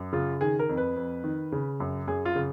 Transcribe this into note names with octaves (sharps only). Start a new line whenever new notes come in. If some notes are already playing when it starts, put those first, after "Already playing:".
Already playing: F#2
C#3 F4
D#3 G#4
A#4
F2
B4
F2
D#3
C#3
F#2
F#2 G#4
F4
C#3